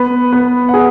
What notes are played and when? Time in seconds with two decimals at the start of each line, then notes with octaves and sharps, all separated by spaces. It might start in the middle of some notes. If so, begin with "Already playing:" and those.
Already playing: B3 B4
0.33 B3 B4
0.69 F#5
0.74 G#4 G#5